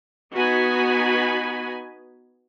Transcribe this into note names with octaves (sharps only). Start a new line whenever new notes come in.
B3 D#4 F#4 G#5 B5